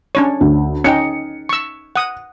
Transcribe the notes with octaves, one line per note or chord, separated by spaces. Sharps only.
C#4 D4 C#5
D2
C#4 D#4 G5 C#7
C#6 E6
F#5 D#6